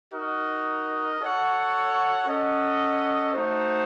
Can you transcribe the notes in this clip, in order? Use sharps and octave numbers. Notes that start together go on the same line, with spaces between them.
D#4 F#4 A#4 D#5
F#4 A4 C#5 F#5
C#4 A4 D#5 F#5
A3 D#4 F#4 C5